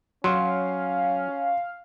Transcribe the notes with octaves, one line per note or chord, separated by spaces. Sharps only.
F#3 C#4 F5 C6